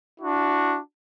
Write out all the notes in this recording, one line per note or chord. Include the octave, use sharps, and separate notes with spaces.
D4 E4 F#4